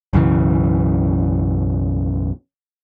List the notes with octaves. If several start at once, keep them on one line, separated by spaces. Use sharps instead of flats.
B1 F#2 C#3 E3